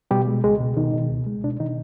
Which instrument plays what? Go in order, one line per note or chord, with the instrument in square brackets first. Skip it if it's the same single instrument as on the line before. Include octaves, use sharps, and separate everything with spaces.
[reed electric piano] B2 G3 G4
G#3
C#2 G#3 G#4
B2
B2 D#3 D#4
B2
C#2
G#3
B2 D4
B2 D#3 D#4